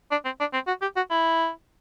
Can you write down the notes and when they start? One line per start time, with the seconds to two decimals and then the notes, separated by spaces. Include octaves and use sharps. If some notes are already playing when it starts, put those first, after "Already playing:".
0.11 D4
0.25 C4
0.40 D4
0.53 C4
0.67 F#4
0.82 G4
0.96 F#4
1.11 E4